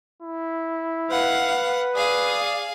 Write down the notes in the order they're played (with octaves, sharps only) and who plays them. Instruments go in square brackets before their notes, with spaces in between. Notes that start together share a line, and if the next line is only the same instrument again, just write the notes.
[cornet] E4
[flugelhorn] B4 [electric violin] F5 [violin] F#5
[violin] G#4 F5 [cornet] D5 [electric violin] D#6